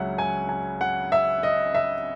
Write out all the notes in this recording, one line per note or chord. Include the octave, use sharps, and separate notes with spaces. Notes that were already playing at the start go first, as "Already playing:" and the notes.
Already playing: C#2 C#3 F#3 C#4 E5 F#5
G#5
G#5
F#5
E5
D#5
E5